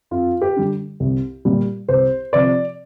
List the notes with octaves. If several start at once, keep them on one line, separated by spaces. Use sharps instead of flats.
F2 F4
G4
D3 G3
C2
A#2 G3
C2 C5
C3 F3 D5